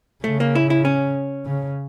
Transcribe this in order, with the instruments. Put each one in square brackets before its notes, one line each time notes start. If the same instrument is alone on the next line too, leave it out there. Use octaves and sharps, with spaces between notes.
[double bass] C#3 [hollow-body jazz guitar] A3
[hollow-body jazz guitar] A#3
E4
E4
C#4
[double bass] C#3